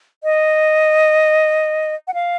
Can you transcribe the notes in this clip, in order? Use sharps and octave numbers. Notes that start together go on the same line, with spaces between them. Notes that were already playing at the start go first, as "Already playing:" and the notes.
D#5
F#5
F5